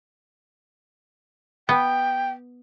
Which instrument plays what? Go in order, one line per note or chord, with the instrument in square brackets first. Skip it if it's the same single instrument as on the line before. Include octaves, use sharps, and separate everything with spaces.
[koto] B3 [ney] G5